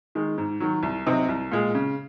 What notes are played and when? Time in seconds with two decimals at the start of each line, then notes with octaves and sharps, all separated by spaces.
0.15 D#3 G#3
0.38 G#2
0.60 D#3 F#3
0.83 C2
1.06 C3 F#3 C4 D#4
1.29 C2
1.52 A#2 G#3
1.75 C#3